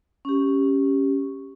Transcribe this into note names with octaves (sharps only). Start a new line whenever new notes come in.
C#4 G4